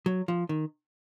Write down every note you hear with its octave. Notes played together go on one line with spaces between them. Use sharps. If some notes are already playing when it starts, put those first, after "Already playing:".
F#3
F3
D#3